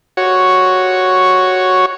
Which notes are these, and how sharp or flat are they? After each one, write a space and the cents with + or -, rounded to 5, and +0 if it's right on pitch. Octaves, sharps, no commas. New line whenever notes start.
F#4 +0 C#5 +0